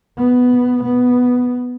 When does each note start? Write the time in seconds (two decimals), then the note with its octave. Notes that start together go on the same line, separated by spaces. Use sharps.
0.17 B3
0.83 B3